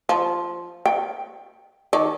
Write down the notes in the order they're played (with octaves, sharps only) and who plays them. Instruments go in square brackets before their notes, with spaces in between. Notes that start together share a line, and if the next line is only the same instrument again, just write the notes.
[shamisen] F3
G5
D#3 D5